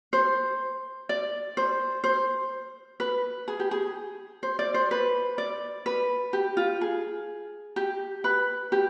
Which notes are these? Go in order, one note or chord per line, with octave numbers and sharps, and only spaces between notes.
C5
D5
C5
C5
B4
G#4
G4
G#4
C5
D5
C5
B4
D5
B4
G4
F4
G#4
G4
B4
G4